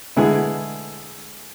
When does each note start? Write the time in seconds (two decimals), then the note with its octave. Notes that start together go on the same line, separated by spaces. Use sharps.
0.16 D3 G#3 B3 E4 G#4